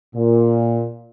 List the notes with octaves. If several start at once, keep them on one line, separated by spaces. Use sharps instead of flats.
A#2